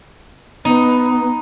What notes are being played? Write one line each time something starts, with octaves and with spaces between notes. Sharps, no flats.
B3 D#4